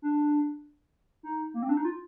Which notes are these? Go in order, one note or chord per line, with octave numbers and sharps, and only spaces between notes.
D4
D#4
A#3
C4
D4
D#4
F4